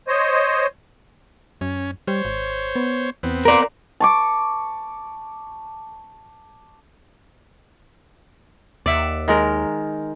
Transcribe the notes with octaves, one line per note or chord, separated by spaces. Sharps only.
C5 C#5 D#5
F#2 C#4
G3 C5 C#5
G#1
B3
E2 B3 C4
A#4 D5
A5 C#6 D6
D#2 D5 E5 F#5
D#3 G#3 A#4